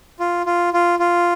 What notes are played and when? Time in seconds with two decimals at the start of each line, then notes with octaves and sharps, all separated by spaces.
0.20 F4
0.46 F4
0.73 F4
0.99 F4